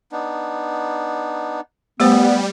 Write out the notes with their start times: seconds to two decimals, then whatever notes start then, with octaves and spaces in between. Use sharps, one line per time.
0.12 B3 D4 D#4
2.00 G3 A3 B3 C5